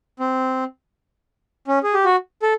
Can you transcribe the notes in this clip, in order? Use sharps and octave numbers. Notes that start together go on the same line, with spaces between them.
C4
C#4
G#4
G4
F#4
A4